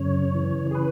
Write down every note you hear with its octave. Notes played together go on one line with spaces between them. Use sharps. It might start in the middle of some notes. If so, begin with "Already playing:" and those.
Already playing: F#2 C#3 C#5
E3
G#4
B4